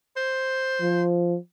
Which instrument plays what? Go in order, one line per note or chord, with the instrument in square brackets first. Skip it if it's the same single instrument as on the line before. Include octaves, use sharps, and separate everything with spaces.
[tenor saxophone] C5
[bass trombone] F3